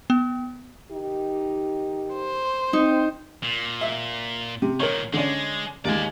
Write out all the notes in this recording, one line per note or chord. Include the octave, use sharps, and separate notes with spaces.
B3
D#3 D#4 G4
C5
C4 D#4
A#2
E5
C3
A#2 D#3 A#4 C#5
D3 G#3 C#4 D5
D#2 G#3 D5 G#5